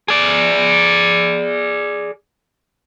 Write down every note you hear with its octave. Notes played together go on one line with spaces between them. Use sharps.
G#4 D5